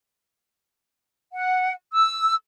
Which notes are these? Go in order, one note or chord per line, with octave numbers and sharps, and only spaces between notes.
F#5
E6